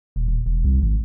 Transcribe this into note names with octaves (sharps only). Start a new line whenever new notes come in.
D#1
D#1
E1
C2
G#1